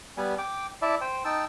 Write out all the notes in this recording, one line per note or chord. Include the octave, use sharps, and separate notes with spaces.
G3 B3 G#5
G5 D6
E4 D5 E5 A5
C5 G5
D#4 G5 A5 E6